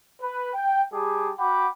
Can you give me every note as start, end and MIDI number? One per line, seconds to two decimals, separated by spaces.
0.22 0.49 71
0.53 0.83 79
0.93 1.31 55
0.93 1.31 67
0.93 1.31 68
0.93 1.31 81
0.93 1.31 86
1.38 1.67 66
1.38 1.67 78
1.38 1.67 79
1.38 1.67 83
1.38 1.67 86